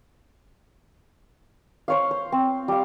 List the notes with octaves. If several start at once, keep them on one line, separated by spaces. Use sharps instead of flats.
C5 C#5 F5
C5
C4
G3 F5